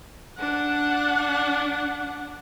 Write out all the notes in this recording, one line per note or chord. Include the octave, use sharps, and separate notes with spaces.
D4 F#5